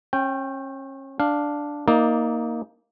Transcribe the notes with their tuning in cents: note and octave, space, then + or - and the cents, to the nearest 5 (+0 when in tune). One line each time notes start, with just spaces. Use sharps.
C#4 -35 G5 +0
D4 +0 F5 +0
A#3 +0 D#4 +20 D5 +0